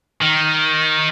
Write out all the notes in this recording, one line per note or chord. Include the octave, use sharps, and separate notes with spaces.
D#3